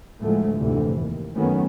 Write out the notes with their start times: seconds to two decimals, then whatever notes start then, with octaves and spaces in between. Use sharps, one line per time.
0.20 D2 A2 F3 F#3 G#3 A3
0.58 F1 D2 G#2 C3 E3
1.00 D#2
1.36 F#2 D#3 F#3 A3 B3 C#4